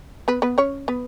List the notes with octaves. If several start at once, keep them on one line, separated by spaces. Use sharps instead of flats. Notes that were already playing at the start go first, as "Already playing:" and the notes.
B3 B4
B3 B4
C#4 C#5
B3 B4